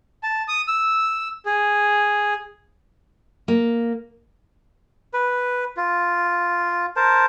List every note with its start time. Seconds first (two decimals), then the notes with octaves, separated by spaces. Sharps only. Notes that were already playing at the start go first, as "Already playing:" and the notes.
0.23 A5
0.48 D#6
0.68 E6
1.46 G#4
3.48 A#3
5.14 B4
5.77 F4
6.96 A#4 C5 A5